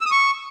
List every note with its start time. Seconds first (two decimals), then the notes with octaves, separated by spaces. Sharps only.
0.01 E6
0.06 D#6
0.11 C#6